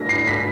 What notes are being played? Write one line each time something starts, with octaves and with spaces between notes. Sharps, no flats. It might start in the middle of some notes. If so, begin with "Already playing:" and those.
Already playing: A3 A#6 B6
C7
B6